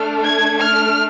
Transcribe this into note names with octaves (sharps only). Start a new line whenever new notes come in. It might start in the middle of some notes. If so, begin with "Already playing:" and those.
Already playing: A3 D4 A4 F6
G#6
F6